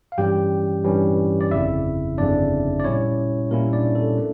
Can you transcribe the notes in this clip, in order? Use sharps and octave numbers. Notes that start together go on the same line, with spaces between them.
F5
G2 E3 G3 C#4 G4 G5
G2 E3 G3 C#4
D5
G1 F2 C#3 E4 E5
G1 F2 C#3 D4 D5
D5
A#2 G3 C#4 E4 C#5
A#2 G3 A#3 C#4 E4 A#4
D4 D5
A4
A3 D4